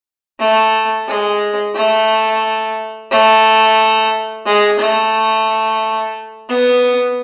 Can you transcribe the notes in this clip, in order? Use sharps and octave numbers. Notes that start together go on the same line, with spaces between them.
A3
G#3
A3
A3
G#3
A3
B3